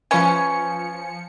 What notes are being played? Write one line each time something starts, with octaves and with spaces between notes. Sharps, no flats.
E3 F3 C#4 G#5 C#7